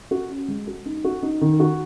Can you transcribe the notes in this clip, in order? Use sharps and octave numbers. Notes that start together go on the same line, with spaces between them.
F#4
C#4
G#3
F#4
D#4
F#4
D#4
D#3
F#4